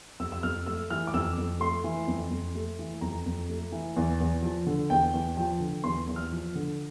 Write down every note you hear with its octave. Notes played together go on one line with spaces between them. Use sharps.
F2 E6
E6
F2 F6
A3 E6
E3 F6
D6
F2 E6
F2
A3 C6
E3
F2
F2
A3
E3
F2 A#5
F2
A3
E3
E2
E2
F3
D3
E2 G5
E2
F3 G5
D3
E2 C6
E2
F6
F3
D3